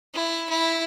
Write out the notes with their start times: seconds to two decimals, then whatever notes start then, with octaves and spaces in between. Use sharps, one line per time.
0.14 E4
0.50 E4